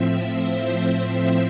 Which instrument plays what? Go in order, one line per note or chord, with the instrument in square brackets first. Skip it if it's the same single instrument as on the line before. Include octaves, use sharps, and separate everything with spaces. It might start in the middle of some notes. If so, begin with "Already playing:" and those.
Already playing: [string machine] A2 F3 C4 E5
C5